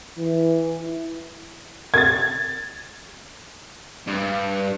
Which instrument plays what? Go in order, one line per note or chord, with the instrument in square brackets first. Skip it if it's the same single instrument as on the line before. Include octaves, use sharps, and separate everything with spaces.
[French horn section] E3
E4
[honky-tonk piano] G#6 A6
[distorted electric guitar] G2